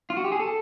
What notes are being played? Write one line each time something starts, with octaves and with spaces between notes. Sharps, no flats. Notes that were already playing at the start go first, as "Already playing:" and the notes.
F4
F#4
G4
G#4
A4